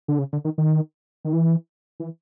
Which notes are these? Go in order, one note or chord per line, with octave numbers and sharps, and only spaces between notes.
D3
C#3
D3
D#3
D#3
D#3
E3
E3